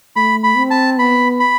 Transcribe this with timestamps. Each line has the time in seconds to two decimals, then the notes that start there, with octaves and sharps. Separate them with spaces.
0.16 A3 B5
0.44 B5
0.57 C4
0.71 A5
0.99 B3 B5
1.40 B5